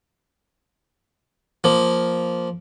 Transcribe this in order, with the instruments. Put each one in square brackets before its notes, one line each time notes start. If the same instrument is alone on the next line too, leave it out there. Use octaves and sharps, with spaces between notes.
[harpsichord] F3 A#3